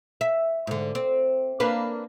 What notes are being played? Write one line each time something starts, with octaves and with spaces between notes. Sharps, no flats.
E5
G#2 D3
C4
A#3 D4 B4